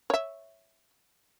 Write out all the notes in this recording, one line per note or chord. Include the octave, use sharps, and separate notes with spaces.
C#5 E5